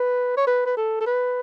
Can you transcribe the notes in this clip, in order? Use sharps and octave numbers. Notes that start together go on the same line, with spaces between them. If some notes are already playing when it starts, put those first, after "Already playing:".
Already playing: B4
C#5
B4
B4
A4
A4
B4